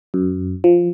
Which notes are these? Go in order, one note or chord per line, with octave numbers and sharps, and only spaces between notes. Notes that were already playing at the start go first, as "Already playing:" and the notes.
F#2
F3